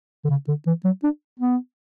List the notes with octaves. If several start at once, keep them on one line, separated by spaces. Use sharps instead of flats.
D3
C#3
D3
E3
F#3
D4
B3